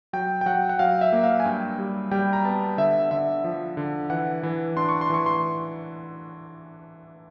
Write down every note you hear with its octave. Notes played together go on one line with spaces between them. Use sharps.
F#3 G5
G5
F#3 F#5
F#5
F#3 F5
E5
A#3
F5
G#5
G2 G5
G3
G3 G5
A#5
B3 A5
D3 E5
D3 E5
F3
D3
E3 F#5
E3
D4 C6
C#6
C6
E3 C#6
C6